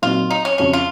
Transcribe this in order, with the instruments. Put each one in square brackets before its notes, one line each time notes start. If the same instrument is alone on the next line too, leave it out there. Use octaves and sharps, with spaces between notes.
[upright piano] A#2 F#3 C4 D#4 [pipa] F4
[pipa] D#4
C#4
[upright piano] F2 C#3 F3 [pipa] C#4
[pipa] F4